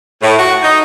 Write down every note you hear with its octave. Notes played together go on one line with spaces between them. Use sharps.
A2
F#4
D#4